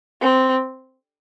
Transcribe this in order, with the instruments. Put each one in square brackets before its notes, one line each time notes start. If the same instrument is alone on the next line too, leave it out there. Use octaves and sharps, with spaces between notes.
[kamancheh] C4